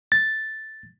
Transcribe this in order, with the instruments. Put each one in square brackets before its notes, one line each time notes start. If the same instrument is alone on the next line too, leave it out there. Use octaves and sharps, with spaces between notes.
[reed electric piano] A6